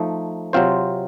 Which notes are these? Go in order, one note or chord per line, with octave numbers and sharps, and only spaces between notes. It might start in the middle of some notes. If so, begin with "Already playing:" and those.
Already playing: F3 A3 D#4
C3 F#3 C4 F4 C5